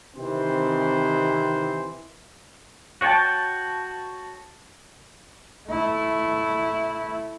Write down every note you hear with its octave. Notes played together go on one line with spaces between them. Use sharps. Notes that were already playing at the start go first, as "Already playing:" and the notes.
C3 D#3 E3 C4 C5
F#4 C#5 G5 A5
A3 E4